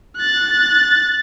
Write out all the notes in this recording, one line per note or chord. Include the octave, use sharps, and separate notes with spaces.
F#6 A6